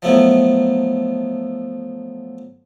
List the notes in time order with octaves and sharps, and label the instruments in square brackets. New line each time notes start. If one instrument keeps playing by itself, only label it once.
[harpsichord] F3 F#3 A3 B3 E4